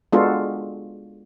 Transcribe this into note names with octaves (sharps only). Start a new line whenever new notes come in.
G#3 B3 D4 F4 F#4 A4